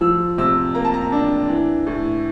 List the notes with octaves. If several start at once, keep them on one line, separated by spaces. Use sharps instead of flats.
F3 E6
C3 E6
A#3 A#5
A5
A#5
D4
E3
A2